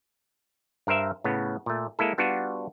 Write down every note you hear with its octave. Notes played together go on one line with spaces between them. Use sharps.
G2 A#4 C5 E5
A2 C#3 B3
A#2 A3
G#3 A#3 E4 A4
G3 B3 D4 F4 F#4